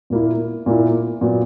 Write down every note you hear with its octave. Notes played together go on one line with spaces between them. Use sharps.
A#2 A#3 E4
A#2 A#3 E4
A#2 F#3 B3